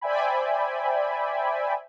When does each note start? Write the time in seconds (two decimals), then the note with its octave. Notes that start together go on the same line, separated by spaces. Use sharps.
0.01 C5 D5 E5 G5 G#5 B5